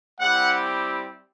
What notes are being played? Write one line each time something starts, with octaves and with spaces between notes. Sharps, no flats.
G3 C4 E4 G4 F#5